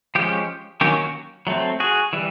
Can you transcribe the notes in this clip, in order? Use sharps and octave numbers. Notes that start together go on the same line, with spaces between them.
F3 G#3 C#4 G4
D#3 F#3 A#3 C#4 G4
F#4
F#3 A3 C4
F#4 G#4
E3 G3